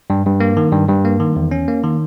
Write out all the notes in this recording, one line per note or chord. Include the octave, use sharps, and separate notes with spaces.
G2
G2
A#3
D#3
G2
G2
A#3
D#3
E2
C#4
A#3
D#3